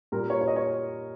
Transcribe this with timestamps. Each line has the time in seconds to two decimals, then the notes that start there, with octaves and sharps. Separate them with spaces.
0.12 A#2 G3 A#3 A#4
0.30 C#5
0.41 C#5
0.48 D#5
0.56 C#5